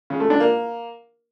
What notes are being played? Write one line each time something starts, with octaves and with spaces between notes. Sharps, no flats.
C#3
A3
D4
A#3